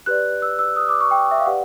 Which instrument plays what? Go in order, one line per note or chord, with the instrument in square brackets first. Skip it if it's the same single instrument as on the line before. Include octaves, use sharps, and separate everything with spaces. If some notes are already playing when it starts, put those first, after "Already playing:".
[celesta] G4 B4 D5 F#6
E6
E6
D#6
D6
C#6
G5
E5
F5
G4 B4 D5 F#5